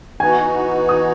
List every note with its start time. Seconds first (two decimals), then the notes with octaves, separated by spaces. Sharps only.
0.20 E3 B3 D#4 F#4 G#5
0.89 D#6